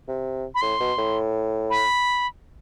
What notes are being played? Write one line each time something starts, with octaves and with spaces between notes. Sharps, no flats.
C3
B5
A2 C6
B2
A2
B5